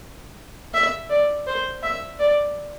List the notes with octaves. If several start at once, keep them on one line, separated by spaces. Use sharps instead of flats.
E5
D5
C5
E5
D5